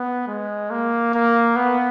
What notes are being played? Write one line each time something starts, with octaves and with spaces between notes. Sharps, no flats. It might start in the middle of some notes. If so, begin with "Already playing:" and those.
Already playing: B3
G#3
A#3
A#3
B3